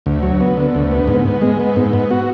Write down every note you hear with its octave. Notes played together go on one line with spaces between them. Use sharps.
D2
F#3
B3
D3
D2
B3
G#2
B3
G#3
B3
G#2
B3
F#4